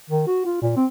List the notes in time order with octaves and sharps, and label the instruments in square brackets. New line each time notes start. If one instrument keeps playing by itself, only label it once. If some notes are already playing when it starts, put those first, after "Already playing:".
[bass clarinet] D#3
F#4
F4
A#2
C4